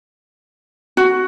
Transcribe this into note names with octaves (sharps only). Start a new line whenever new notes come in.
F#4